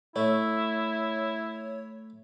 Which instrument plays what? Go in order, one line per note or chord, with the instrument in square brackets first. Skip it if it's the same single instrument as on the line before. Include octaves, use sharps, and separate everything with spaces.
[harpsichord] A3 [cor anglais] E4 [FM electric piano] C#5